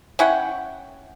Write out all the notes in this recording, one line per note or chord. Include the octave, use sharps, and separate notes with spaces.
C#4 E4 F#5 G5